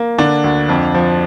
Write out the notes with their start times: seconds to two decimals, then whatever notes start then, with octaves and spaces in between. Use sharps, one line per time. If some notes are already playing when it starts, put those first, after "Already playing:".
Already playing: A#3
0.18 D3 D4
0.44 D2
0.69 F2
0.94 F3